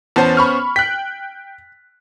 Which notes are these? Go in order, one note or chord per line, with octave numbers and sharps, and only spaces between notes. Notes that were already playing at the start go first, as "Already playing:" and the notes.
E2 B3 C#4 C5 A5
B5 C#6 F6
G5 F#6 B6